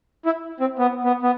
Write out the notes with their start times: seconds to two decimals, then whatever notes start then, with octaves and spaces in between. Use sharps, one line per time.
0.25 E4
0.60 C4
0.79 B3
1.04 B3
1.23 B3